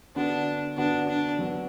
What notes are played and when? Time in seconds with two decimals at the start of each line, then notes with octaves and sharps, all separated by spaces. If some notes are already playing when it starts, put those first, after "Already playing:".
0.16 D3 B3 D4 F#4
0.77 D3 B3 D4 F#4
1.08 D4
1.39 F#3 B3 F#4